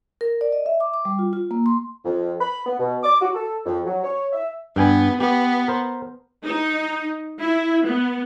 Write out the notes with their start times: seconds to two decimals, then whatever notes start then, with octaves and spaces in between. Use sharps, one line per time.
0.21 A#4
0.41 D5
0.53 D#5
0.66 E5
0.80 D6
0.94 D6
1.05 G3
1.19 F4
1.33 F4
1.51 A#3
1.66 C6
2.05 F2
2.41 B5
2.66 B3
2.80 B2
3.03 D6
3.21 F#4
3.35 A4
3.65 F2
3.85 F#3
4.04 C#5
4.33 E5
4.76 G2 B3 G5 G#5
5.20 B3 G4
5.68 A#4 C5
6.45 D#4
7.40 E4
7.87 B3